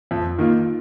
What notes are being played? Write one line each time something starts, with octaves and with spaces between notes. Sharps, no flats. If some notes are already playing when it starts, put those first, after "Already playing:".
F2
D#3 A#3 F4